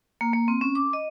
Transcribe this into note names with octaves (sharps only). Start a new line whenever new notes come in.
A#3
A#3
C4
C#4
D6
D#5